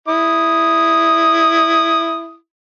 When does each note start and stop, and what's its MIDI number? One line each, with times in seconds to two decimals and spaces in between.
0.08 2.35 64
0.08 2.35 87